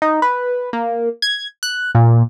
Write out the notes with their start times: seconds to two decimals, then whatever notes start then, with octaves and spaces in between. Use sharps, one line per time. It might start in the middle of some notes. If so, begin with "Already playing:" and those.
0.02 D#4
0.22 B4
0.73 A#3
1.22 G#6
1.63 F#6
1.95 A#2